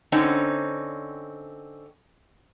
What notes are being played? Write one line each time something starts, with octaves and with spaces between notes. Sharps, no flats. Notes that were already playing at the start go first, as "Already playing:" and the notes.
D3 C4 C#4 D#4